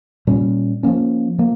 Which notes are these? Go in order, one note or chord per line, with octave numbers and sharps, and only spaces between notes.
A#2 G3 C#4
F3 A#3 C#4
F3 A#3